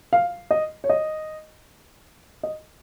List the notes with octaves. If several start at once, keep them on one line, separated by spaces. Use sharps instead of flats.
F5
D#5
C#5
D#5
D#5